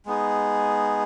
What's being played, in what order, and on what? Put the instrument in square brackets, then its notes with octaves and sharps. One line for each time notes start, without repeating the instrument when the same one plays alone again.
[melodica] G#3 B3 D#4 G#4